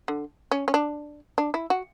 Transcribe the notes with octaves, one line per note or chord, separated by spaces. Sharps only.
D3
C#4
C#4
D4
D4
E4
F#4